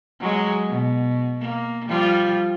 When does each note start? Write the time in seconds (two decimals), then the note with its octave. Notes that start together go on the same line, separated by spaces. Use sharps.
0.20 F#3 G#3
0.69 B2
1.41 A#3
1.88 F3 G3 F4